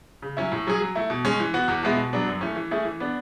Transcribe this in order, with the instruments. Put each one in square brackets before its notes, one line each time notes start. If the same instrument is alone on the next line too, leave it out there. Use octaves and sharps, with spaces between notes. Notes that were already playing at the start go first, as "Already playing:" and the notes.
[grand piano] C#3
F#3 C#4 E4
A2
F#3 C#4 G#4
F#3
A3 E4
B2
G#3 C#4
E3
B3 F#4
E2
B2 G#3 B3 E4
B2
F#3 B3 D4
F#2
E3 A3 C#4
E3
A3 C#4 E4 G#4
E3
B3 D4